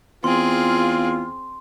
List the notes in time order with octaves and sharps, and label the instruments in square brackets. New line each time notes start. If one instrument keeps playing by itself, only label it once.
[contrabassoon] E2 [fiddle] C4 G#4 [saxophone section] F4 [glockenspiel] C6